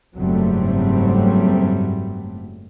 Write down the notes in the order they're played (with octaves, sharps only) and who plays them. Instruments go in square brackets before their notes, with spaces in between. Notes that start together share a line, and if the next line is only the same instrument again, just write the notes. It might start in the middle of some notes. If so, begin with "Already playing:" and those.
[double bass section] F#1 G#2 F#3 G3 A3 C4